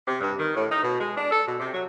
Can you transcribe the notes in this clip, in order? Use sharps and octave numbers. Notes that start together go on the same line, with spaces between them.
C3
G2
D#3
A2
D#4
B2
G#3
D4
A4
B2
C3
F#3